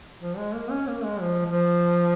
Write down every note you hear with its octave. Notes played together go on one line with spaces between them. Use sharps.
F3
G#3
A#3
C#4
A#3
G#3
F3
F3